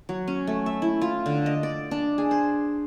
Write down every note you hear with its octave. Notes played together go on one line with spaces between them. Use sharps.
F#3
C#4
A3
E5
E4
F4
D3
D#5
D5
D4
G#4
C5